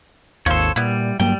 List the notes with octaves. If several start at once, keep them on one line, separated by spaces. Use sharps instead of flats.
G#1 D#2 F3 A4 C5 C#5
A#2 G3 B3 E4
G2 F#3 G3 A#3 G5